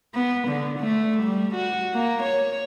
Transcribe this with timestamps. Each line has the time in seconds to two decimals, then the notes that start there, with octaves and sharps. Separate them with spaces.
0.14 B3
0.48 D3
0.80 A3
1.23 G3
1.55 F#4
1.94 A#3
2.23 C#5